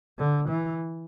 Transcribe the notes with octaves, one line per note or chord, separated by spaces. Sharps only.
D3
E3